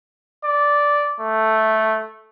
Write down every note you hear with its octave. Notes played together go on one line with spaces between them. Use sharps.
D5
A3